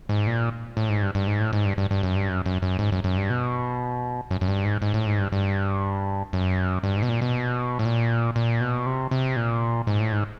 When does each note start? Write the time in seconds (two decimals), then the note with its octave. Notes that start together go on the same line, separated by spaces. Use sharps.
0.09 G#2
0.27 A#2
0.77 A2
0.89 G#2
1.02 G2
1.15 G2
1.27 G#2
1.40 A2
1.53 G#2
1.65 G2
1.78 G2
1.91 G2
2.03 F#2
2.16 G2
2.29 F#2
2.46 F#2
2.62 F#2
2.79 G#2
2.92 F#2
3.04 F#2
3.17 G2
3.30 B2
4.31 F#2
4.41 F#2
4.48 G2
4.65 G#2
4.82 G#2
4.94 A2
5.06 G#2
5.19 G2
5.32 G2
6.33 F#2
6.83 G2
6.96 G#2
7.02 B2
7.09 A#2
7.22 B2
7.79 A2
7.85 A#2
8.36 A#2
8.61 B2
8.86 C3
9.11 C3
9.36 A#2
9.87 G#2
10.00 A2
10.12 G#2